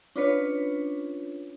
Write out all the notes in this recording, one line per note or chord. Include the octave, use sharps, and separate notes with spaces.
C#4 D4 F4 B4 C#5